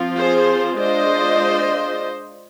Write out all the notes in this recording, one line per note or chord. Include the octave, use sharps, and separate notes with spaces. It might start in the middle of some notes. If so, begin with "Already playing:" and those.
Already playing: F3 C4 F4
G#4 C5
G#3 D4 F4 C5 D#5